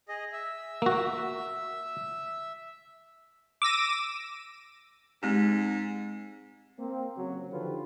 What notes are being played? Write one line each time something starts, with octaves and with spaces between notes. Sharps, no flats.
G#4 D#5
E5
A#3 F#4
D6 E6 A#6 D#7
G#2 G#3 C4 G4
A#3 C4
C#3 F#3
D3 D#3 F3 F4 G4 B4